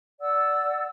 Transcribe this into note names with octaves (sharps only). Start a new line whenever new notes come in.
D5 F#5 E6